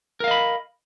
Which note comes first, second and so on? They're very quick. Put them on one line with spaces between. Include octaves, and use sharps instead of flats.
A#4 F5 D#5 B5